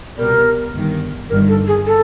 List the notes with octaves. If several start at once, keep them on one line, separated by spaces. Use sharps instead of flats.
C2 B2 G3 A#4
G1 G2 D#3
G1 G2 D#3 A#4
A4
G#4
A4